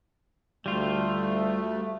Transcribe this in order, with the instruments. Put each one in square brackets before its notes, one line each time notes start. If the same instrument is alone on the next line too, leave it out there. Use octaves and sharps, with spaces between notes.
[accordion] D2 A3 [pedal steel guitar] G3 F4